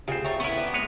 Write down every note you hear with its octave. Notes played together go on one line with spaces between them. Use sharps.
D2 C#3 F4 G4 G#4 C5
A3 C#5 E5 G5 A#5
B3 C#4 E4
D4
G#3 B4 C#5